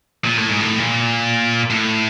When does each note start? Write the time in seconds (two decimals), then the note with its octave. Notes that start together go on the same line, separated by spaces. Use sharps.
0.25 A#2
0.37 A2
0.49 G#2
0.61 A2
0.79 A#2
1.70 A2